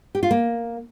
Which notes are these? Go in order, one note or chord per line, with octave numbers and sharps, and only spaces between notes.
G4
F4
A#3